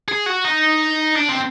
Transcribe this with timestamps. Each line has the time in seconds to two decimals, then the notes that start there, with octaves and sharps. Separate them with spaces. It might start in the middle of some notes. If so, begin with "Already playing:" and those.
0.08 G#4
0.26 F#4
0.44 D#4
1.16 D4
1.29 C4